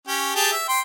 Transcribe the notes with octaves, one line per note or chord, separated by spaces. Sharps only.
C#4 G4
G4 G#4 A5
E5
G5 C6